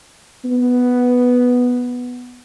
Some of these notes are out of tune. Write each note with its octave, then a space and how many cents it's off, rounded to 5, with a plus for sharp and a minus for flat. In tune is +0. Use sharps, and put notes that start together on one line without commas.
B3 +0